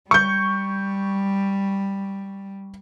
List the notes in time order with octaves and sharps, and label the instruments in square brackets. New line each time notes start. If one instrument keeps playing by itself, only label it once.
[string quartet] G3 [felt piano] C#6 G6